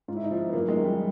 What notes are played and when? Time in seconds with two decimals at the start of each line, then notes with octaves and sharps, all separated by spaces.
0.08 G#2 F4
0.16 E4
0.24 D#4
0.31 F3 E4
0.49 B3
0.53 F#2 A#3
0.68 G#3
0.76 D#3
0.84 G3